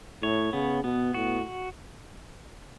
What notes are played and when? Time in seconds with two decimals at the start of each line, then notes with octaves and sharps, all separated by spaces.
0.23 A2 C#5
0.53 C#3 B3
0.84 B2 B3
1.14 A2 F#4